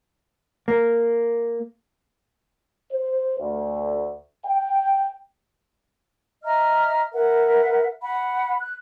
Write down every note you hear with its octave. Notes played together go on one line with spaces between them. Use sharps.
A#3
C5
D2
G5
D#5 E5 A#5 F6
A#4 B4 E5 F#5
F#5 B5
F#6